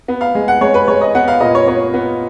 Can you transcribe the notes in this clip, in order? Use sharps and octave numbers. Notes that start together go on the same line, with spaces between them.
B3
F5
G#3
F#5
G#3 C#5
B4
G#3 C#5
D#5
B3 F#5
F5
A#2 D#5
C#5
B3 C#5
B3